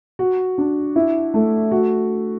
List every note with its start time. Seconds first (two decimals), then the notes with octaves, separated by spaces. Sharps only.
0.19 F#4
0.58 D4
0.96 E4
1.34 A3
1.71 F#4